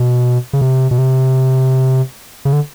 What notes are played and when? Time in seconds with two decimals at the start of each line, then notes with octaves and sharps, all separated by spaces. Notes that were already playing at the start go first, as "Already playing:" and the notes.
Already playing: B2
0.53 C#3
0.61 C3
0.91 B2
0.98 C3
2.45 C#3
2.53 D3